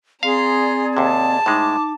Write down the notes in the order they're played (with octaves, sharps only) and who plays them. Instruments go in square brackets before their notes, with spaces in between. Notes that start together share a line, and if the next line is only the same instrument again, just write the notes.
[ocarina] C4 [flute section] G#4 D5 [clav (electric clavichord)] F5 [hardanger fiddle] A#5 C6
[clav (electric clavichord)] D#2 C3 [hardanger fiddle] A5
[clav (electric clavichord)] A2 G#3 [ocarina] D#4 [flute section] D6